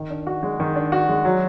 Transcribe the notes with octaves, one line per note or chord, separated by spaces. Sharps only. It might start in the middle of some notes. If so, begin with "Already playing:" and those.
Already playing: D#3
D4
F#4
G#3
D#3
D4
F#4
G#3
F#3